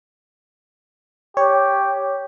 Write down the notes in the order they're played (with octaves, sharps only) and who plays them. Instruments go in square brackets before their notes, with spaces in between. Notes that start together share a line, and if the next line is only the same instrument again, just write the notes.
[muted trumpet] G4 [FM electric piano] C#5